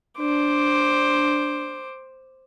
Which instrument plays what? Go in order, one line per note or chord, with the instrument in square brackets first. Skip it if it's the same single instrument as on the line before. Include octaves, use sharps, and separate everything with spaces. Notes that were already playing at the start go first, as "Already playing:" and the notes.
[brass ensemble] D4 [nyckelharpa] C5 D6